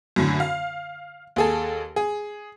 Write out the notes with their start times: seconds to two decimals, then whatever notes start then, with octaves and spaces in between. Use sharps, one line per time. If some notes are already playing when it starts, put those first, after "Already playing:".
0.16 F#2 A2 D3
0.40 F5
1.36 D#2 G#4 A4
1.96 G#4